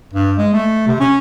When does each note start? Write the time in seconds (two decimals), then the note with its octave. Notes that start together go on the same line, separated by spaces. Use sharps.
0.13 G2
0.37 G#3
0.53 A3
0.87 C3
1.00 C#4